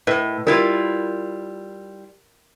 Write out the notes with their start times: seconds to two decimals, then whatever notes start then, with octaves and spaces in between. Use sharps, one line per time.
0.07 A2 A#4 B4 D#5
0.47 G3 E4 F4 A#4